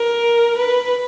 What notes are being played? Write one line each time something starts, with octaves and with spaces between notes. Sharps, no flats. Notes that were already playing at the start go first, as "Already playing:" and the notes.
Already playing: A#4
B4